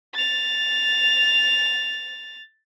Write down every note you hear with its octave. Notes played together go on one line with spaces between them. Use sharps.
A6 F7